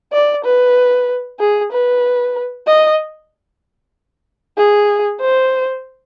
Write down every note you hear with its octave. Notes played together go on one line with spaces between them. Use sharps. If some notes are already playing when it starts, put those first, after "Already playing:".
D5
B4
G#4
B4
D#5
G#4
C5